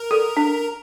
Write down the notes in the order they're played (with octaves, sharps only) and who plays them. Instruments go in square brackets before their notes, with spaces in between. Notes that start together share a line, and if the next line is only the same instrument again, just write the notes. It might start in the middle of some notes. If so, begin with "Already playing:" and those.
Already playing: [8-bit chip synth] A#4
[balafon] A4
D4